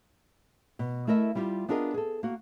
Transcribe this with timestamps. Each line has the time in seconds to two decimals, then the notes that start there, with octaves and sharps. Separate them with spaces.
0.79 B2
1.07 A3 E4 A#4 D#5 E5
1.35 G3 E4 F4 G4
1.68 B3 D4 F4 G#4 A#4 D#5
1.94 G#4 A4
2.23 A#3 F#4